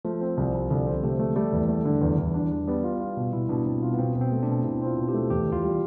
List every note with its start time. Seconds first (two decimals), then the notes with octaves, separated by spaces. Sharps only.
0.05 F3 A3
0.21 C4
0.37 C2
0.54 C2
0.70 C2 D3
0.86 C4
1.03 C3 A3
1.19 A3
1.36 G3 A3
1.52 E2
1.69 A3
1.85 D3
2.01 E2
2.18 E2
2.34 D4
2.51 D4
2.67 G3 B3
2.84 F4
3.01 F4
3.17 B2
3.33 B2 E4
3.49 B2 D4
3.66 B2 C4
3.82 B3 F4
3.93 B3
3.99 B2 C4
4.15 B2
4.21 C4
4.32 A3
4.42 D4
4.48 B2
4.65 B2 E4
4.81 C4
4.87 F4
4.97 B2
5.08 G4
5.14 A3
5.30 E2 G4
5.47 E2
5.52 F4
5.63 G3